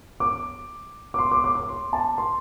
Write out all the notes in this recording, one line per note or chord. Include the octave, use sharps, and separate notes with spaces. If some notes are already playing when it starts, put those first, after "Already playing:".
D6
D6
C6
D6
D6
D6
C6
A5
C6